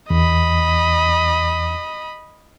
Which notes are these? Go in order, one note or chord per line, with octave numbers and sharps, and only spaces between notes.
E2 D#5 B5